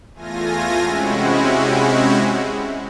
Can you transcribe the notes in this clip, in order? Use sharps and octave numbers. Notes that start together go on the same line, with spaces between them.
E2 A3 F4 G#5 A#6
C3 G#3 C4 C#4 E4 F#4